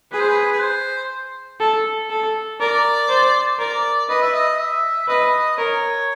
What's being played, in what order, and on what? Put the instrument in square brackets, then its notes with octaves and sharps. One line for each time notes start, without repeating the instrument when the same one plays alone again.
[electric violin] G#4 [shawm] B4
[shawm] C5
B4
B4
C5
[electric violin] A4
A4
[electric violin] A#4 [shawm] D5
[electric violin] C5
[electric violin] A#4 [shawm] D5
[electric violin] B4 [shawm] D#5
[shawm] E5
D#5
E5
[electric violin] B4 [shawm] D#5
[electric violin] A#4 [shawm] C#5